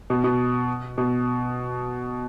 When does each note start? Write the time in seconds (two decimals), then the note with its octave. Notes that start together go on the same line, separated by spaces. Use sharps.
0.10 B2
0.24 B2
0.98 B2